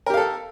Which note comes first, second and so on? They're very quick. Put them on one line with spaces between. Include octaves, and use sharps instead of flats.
A#4 G4 F5 A4